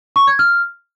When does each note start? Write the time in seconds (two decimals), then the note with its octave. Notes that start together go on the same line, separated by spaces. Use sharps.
0.16 C#6
0.27 G#6
0.39 F6